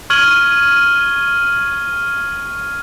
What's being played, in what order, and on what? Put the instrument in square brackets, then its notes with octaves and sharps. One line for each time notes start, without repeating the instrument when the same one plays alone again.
[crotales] C#6 F6 G#6 D#7 F#7 G7